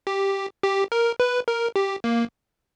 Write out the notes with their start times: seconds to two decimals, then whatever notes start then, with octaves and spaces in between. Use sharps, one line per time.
0.07 G4
0.63 G4
0.92 A#4
1.20 B4
1.48 A#4
1.76 G4
2.04 A#3